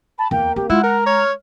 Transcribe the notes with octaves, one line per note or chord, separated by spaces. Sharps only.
A5 B5
E2 A#3 G5
C4 G4
G#3 E4 F4 F#5
A#4 A#5
C#5 F6